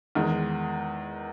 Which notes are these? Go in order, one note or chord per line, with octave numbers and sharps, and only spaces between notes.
E2 D#3 G#3